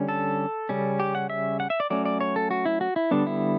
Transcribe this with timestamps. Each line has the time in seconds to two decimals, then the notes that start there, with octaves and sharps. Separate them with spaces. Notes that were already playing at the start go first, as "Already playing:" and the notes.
Already playing: D3 G3 C#4
0.09 A4
0.69 C#3 G3 C#4
1.00 G4
1.15 F#5
1.30 E5
1.60 F#5
1.70 E5
1.80 D5
1.90 F#3 A3 C#4 D5
2.05 D5
2.21 C#5
2.36 A4
2.51 F#4
2.65 E4
2.81 F#4
2.96 E4
3.11 D3 G3 B3 D4
3.27 E4